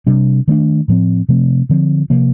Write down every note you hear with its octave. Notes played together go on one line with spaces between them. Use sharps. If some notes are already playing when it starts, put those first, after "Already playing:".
C3 G3 D4
D#3 A3 D4
A2 F3 C4
C3 F3 A3 C4
D3 F3 C4
C3 F3 A#3